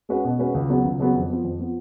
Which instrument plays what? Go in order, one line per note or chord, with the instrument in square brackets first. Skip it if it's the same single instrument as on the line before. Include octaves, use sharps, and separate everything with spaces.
[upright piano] G#3 C#4 F#4 B4
B2
G#3 C#4 F#4 B4
C#2
C#3 F#3 B3 F#4
C#2
C#3 F#3 B3 F#4
F2
F3 B3
F2
F3 B3